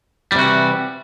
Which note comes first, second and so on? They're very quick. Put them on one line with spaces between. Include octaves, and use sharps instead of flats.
G3 C3 F#4 E3